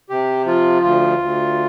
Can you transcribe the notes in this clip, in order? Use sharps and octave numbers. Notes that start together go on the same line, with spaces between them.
C3 G4
F3 F4
D2 F4
D2